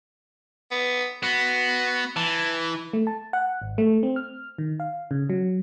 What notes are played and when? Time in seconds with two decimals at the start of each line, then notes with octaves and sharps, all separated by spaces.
0.71 B3
1.23 B3 F#4
2.16 E3 A5
2.93 A3
3.07 A5
3.33 F#5
3.62 G#1
3.78 A3
4.03 C4
4.16 F6
4.58 D#3
4.80 F5
5.11 C#3
5.30 F#3